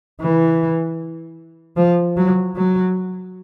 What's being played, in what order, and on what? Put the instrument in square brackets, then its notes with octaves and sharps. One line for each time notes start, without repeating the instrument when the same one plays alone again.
[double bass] E3
F3
F#3
F#3